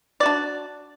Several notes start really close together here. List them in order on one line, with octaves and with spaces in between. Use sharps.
D5 F#4 D4